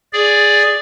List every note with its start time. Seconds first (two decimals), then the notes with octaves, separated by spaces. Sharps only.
0.13 G#4 D5